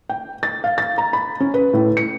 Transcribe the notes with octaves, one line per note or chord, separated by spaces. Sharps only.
G5
A6
F5
A6
A#5
B5
C#4
B4
A2
C#7